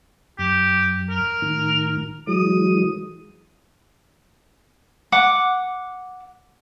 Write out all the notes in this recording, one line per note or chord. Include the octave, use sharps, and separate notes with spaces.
F#2 G4
A#4
A2 D#3
E3 F#3 G#3 D#6
F#5 D6